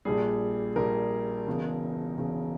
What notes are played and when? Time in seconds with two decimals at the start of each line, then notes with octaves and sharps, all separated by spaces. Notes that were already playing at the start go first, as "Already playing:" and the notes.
0.05 A#1 A#2 G3 G#4
0.76 A#1 A#2 G3 A#4
1.47 E1 E2 C#3
2.18 E1 E2 C#3